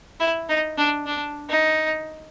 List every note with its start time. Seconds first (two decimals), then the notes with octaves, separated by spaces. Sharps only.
0.20 E4
0.49 D#4
0.78 D4
1.06 D4
1.49 D#4